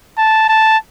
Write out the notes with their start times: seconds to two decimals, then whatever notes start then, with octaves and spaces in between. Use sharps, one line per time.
0.18 A5
0.49 A5